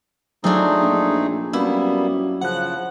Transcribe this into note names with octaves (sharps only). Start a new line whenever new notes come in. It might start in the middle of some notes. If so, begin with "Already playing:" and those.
F3 F#3 A3 C4 D4 D#4 G#4
A#1
F#2 G3 A#3 B3 E4
C#3 F3 F#5 F#6